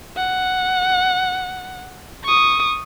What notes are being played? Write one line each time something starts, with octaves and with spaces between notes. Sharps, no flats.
F#5
C#6 D#6